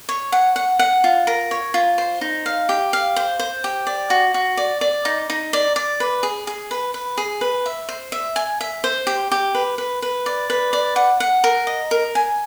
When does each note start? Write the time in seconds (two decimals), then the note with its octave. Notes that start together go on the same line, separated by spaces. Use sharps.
0.09 C#5
0.32 F#5
0.56 F#5
0.79 F#5
1.04 F4
1.27 A#4
1.51 C#5
1.74 F4
1.98 C5
2.21 D#4
2.46 F5
2.69 G4
2.93 F5
3.16 C5
3.39 C5
3.64 G4
3.87 D5
4.10 F#4
4.34 F#4
4.57 D5
4.81 D5
5.05 D#4
5.30 D#4
5.53 D5
5.76 D5
6.00 B4
6.23 G#4
6.47 G#4
6.71 B4
6.94 B4
7.18 G#4
7.41 B4
7.66 E5
7.89 C5
8.12 E5
8.36 G#5
8.61 E5
8.84 C5
9.07 G4
9.32 G4
9.55 B4
9.78 B4
10.02 B4
10.26 D5
10.50 B4
10.73 D5
10.96 F#5
11.20 F#5
11.44 A#4
11.67 D#5
11.91 A#4
12.15 G#5